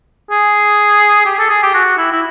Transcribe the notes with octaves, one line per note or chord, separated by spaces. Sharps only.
G#4
G4
A4
G#4
G4
F#4
E4
E4